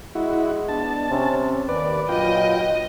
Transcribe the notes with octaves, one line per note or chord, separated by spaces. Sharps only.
G#3 E4 F#4
B3 D4 A5
C3 C#4
D#2 B4 D5
G2 A#2 F#3 F4 D#5 G5